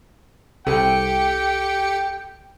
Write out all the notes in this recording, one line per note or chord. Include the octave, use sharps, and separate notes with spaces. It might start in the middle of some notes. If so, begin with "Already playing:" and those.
C2 G4 A4 G5 C#7